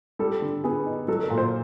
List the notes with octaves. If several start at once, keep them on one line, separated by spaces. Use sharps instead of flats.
G3 A4
D3
B3 G#4
D#4
F#3 A4
A#4
A#2
C5